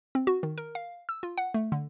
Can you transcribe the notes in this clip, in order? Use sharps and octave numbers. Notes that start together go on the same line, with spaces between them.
C4
F#4
D#3
A#4
F5
E6
F4
F#5
A3
D3